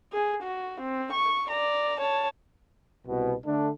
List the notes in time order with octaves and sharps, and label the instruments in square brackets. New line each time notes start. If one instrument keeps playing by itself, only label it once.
[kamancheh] G#4
F#4
C4
C#6
D5 A#5
C#5 A5
[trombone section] C2 B2
D3 A3 D4